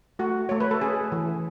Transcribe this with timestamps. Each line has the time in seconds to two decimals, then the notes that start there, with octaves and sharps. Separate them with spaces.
0.19 A3 F#4
0.49 A3 C#5
0.60 B4
0.71 A4
0.81 C#4 G#4
1.12 E3